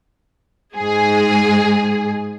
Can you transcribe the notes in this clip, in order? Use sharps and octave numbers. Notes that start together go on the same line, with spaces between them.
G#2 G#4